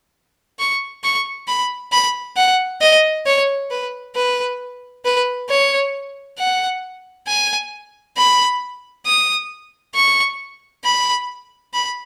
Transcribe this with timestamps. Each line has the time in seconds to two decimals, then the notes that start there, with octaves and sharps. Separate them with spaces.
0.59 C#6
1.04 C#6
1.48 B5
1.92 B5
2.37 F#5
2.81 D#5
3.26 C#5
3.71 B4
4.16 B4
5.05 B4
5.50 C#5
6.39 F#5
7.28 G#5
8.17 B5
9.06 D#6
9.95 C#6
10.85 B5
11.74 B5